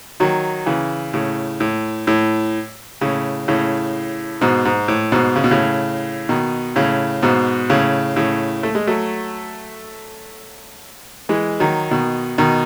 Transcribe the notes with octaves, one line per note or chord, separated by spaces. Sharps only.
D#3 F#3
C#3 E3
A2 C#3
A2
A2
A2 C#3
A2 C#3
G#2 B2
G#2
A2
G#2 B2
C#3
B2
A2 C#3
B2 D#3
A2 C#3
G#2 B2
A2 C#3
A2 C#3
A3
G#3
F#3 A3
E3 G#3
D#3 F#3
B2 D#3
B2 D#3